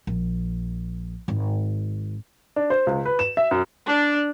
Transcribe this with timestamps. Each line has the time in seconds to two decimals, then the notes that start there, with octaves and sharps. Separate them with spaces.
0.07 A#1
1.28 G#1
2.56 D4
2.70 C5
2.87 C#2
3.05 B4
3.19 E7
3.37 E5
3.51 F#2
3.87 D4